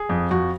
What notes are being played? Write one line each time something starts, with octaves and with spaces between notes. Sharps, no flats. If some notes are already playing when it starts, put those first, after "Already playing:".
Already playing: G#4
F2
F2 F#4